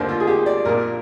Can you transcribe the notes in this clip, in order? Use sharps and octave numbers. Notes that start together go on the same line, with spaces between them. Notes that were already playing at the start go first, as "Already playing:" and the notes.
Already playing: D#2 D3 C5
F4
G#4
G4
D5
A#1 A#2 A#4